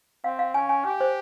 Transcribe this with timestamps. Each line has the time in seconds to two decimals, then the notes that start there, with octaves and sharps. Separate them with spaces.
0.24 C4 F5
0.39 F5
0.54 C#4 G#5
0.69 G#5
0.85 G4 G#5
1.00 C5